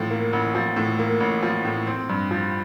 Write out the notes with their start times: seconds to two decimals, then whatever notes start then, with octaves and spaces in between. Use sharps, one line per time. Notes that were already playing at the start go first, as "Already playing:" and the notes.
Already playing: A1 A2 F3
0.11 A#3
0.33 A1
0.55 F3
0.76 A2
0.99 A#3
1.20 A1
1.43 F3
1.65 A2
1.87 C4
2.09 G2
2.31 F3